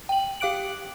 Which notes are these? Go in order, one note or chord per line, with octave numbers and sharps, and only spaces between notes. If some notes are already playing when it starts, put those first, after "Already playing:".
G5 F#7
G4 F5 D6 F#6 D7 F#7